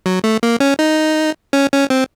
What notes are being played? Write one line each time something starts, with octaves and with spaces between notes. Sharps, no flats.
F#3
A3
A#3
C#4
D#4
C#4
C#4
C4